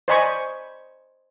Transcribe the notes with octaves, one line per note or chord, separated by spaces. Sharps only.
C5 D5 D#5 G#5 B5 C#6